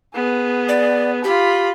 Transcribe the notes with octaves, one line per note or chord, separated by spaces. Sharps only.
B3 G#4
D5
F4 G4 B5